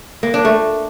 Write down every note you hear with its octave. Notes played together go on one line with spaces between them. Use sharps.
A#3
D4
A3